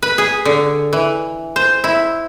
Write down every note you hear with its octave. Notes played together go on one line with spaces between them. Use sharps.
B4
G#4
D3
E3
C5
E4